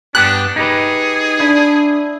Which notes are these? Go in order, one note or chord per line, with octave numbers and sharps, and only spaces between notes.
G2 B3 D4 G4 F#6
D#4 G4 G#4 B4
D4 E4